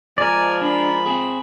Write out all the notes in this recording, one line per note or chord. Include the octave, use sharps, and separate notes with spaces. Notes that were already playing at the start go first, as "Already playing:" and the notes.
F3 G#3 A#4 D5 G#5
D4 B5
C4 G#4